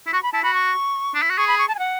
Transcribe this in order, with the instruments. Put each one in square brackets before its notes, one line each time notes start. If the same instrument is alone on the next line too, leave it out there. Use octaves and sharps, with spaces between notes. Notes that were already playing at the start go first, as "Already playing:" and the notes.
[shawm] E4
[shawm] F#4 [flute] C#6
[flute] B5
[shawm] E4 [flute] A5
[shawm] F#4 [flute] B5
[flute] C#6
[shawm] D4
E4
F#4
[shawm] G#4 [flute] C#6
[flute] B5
C#6
A5
G#5
F#5